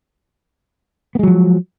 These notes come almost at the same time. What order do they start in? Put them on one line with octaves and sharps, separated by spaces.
B3 G#3 F#3 F3